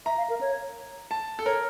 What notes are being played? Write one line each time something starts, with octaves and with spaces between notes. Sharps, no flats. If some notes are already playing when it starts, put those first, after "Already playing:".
E5 A#5
F5
A#4
C#5
A5
A4
A#4 C#5